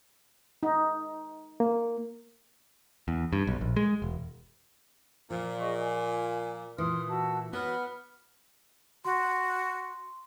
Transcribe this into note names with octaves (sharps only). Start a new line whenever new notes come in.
D#4
A#3
E2
G2
B1
A#1
G#3
E1
A#2 F3
G#4 D#5 C#6
G#5
A#2 E3 C6 D#6 F6
F#4 A5 E6
F#3 B3 F#4 B5 F6
F#4 C6